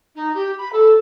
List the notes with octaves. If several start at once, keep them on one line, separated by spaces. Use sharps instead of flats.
D#4
G4
B5
A4